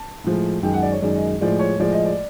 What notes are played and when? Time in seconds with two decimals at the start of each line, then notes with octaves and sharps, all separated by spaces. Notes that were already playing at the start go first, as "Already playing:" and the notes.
Already playing: A5
0.24 A2 F3 G#3
0.63 F#2 D#3 G#3 G5
0.73 F#5
0.82 D5
0.92 C#5
1.02 F#2 D#3 G#3 D5
1.16 D#5
1.41 A2 F3 G#3 D5
1.59 C#5
1.80 A2 F3 G#3 D5
1.93 D#5
2.05 D5